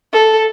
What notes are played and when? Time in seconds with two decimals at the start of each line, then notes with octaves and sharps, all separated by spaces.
0.13 A4